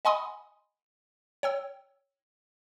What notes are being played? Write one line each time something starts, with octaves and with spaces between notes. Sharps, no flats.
D#5 F#5 G#5 B5 C6 D#6
C#5 G5 E6